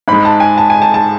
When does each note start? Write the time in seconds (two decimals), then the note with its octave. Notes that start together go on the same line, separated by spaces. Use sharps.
0.08 G#2 G#3 B5
0.25 A5
0.40 G#5
0.58 A5
0.70 G#5
0.82 A5
0.94 A5